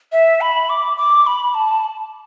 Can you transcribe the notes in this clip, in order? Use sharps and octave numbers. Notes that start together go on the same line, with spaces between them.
E5
B5
D6
D6
B5
A5